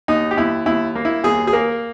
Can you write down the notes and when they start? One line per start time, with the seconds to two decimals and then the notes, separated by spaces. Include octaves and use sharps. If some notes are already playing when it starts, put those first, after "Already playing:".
0.08 D#2 D#4
0.31 G4
0.37 D#2 E4
0.66 D#2 E4
0.95 A#3
1.05 E4
1.24 D#2 G#4
1.47 G#4
1.53 A#3 A#4